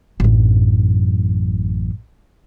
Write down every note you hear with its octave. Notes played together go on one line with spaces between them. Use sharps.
A1 F#2